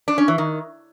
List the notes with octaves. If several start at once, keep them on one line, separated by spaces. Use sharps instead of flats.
D4
C#4
E3
D#3